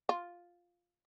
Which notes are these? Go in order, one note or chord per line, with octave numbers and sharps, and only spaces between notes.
F4